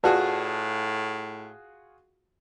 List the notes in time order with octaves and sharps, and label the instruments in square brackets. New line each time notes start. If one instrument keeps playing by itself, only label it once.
[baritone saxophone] A2 [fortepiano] F4 F#4 G#4 [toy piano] B4 D5 A5